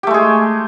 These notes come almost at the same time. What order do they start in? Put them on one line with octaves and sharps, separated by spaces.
G4 A3 G#3 G#4